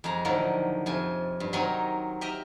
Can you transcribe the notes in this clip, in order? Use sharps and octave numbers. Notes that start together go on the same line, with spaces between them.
F2 G#3 G#4 A#5
A2 D3 D#3 F3 F#3 A#3
F2 C3 F4 G#5
G2
D#3 F#3 C4 D#4 A#4 G#5
G4 A#4 D#5 E5 A#5